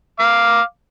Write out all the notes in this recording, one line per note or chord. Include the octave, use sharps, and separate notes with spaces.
F5 D6